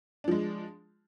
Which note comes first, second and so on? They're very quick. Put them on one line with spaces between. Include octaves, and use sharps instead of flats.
D4 F3 G#3